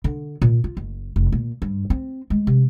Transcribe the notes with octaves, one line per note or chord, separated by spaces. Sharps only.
D3
A#2
F4
F#1
F1
A#2
G2
C4
G#3
C3